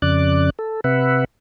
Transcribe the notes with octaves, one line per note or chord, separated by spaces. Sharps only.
F2 C#3 D5 D6 F#6
A4
C3 B4 E5 F#5